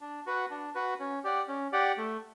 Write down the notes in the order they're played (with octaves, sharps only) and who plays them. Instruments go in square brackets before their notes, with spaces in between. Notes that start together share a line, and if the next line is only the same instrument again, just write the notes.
[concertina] D4
F#4 B4 F#5
D4
F#4 B4 F#5
C#4
G4 D5 F#5
C#4
G4 D5 F#5
A3